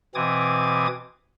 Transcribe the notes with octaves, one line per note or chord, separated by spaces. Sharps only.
B2 E3 C4 D6 D#6 G#6